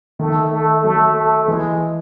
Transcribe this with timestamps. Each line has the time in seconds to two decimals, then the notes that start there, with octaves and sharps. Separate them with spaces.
0.19 D#3 A3
0.52 A3
0.84 F#3 A3
1.16 A3
1.48 E3 G#3